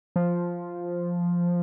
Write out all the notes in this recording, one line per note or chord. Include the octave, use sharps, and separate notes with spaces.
F3